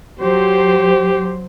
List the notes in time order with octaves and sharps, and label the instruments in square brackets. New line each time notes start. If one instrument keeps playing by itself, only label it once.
[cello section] F#3 C5 [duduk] G4